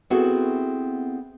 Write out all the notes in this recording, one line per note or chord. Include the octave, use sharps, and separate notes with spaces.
B3 C4 E4 F#4 G#4 A4